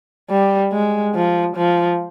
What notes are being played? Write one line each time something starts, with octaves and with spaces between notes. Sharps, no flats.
G3
G#3
F3
F3